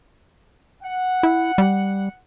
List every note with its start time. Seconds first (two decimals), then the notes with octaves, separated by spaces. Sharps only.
0.83 F#5
1.23 E4
1.58 G3